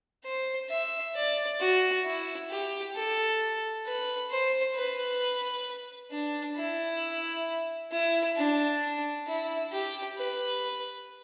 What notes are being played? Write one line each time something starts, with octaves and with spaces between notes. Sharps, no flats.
C5
E5
D5
F#4
E4
G4
A4
B4
C5
B4
D4
E4
E4
D4
E4
G4
B4